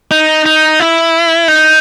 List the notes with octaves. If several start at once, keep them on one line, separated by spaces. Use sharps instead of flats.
D#4
D#4
E4
D#4